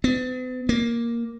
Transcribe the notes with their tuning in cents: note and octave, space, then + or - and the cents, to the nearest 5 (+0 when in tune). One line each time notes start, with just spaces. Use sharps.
B3 +45
A#3 +5